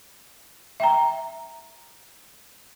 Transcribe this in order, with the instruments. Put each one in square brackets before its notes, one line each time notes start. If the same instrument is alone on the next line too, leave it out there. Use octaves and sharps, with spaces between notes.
[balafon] E5 G5 A#5